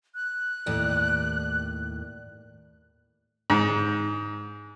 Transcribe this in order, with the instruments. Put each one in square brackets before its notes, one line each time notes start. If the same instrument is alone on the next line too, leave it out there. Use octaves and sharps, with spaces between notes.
[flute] F#6
[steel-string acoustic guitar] D#2 A2 D5
[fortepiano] G#2